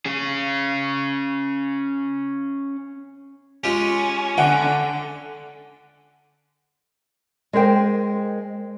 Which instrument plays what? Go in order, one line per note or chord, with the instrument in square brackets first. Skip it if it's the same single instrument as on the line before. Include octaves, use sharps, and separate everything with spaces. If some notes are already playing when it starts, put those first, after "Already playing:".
[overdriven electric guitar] C#4 G#4
[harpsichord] G#3 F4 G4 [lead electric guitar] C#4
[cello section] D3 [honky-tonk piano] F#5 [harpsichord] G5
[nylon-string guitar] G#3 A#4 C5 G5